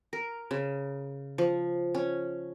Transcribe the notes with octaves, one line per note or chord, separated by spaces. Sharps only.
A#4
C#3
F3
C#4